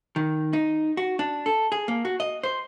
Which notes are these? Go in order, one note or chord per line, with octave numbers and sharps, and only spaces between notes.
D#3
D#4
F#4
D4
A4
G#4
A#3
F#4
D#5
C5